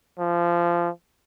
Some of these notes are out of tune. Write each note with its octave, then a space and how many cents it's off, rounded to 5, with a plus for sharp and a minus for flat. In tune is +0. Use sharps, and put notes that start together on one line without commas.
F3 -20